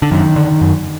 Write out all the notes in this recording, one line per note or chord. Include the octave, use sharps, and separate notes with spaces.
D3
F#2 D#3
D3
F#2